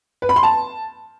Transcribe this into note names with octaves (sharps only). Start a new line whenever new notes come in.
B4
B5
C6
A5